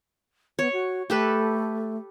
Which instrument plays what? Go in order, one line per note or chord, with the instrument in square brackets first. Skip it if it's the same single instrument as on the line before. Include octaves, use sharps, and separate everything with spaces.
[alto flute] B3 [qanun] C#5
[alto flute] F#4
[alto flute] A3 [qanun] G4 A4 B4